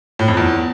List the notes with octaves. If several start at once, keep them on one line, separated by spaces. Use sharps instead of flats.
A2
F2
E2